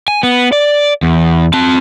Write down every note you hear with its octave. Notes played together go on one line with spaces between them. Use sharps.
G#5
B3
D5
E2
C4 A5